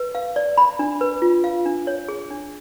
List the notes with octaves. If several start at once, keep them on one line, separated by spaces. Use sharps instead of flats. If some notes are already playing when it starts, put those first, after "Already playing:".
Already playing: B4
F5
D5
B5
D4
B4
F4
F5
D4
C#5
G#4
D4